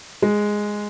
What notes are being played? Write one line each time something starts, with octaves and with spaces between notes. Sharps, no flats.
G#3